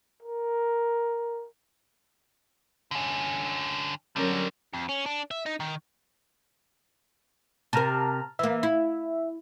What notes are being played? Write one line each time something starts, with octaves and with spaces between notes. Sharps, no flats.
A#4
D3 C#4
D3 F#3 G3 C#4 A#4
F2
C#4
D4
E5
D#4
D#3
C3 A#4 A5 A#5 F6
E3 A#3 E5
E4